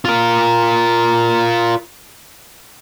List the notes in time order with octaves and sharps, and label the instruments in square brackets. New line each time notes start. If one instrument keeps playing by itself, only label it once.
[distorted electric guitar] F4 A#4